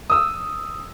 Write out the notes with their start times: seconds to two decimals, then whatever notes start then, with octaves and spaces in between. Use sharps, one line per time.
0.10 D#6 E6